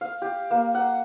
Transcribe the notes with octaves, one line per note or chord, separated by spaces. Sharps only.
F5
G4
A#3
F#5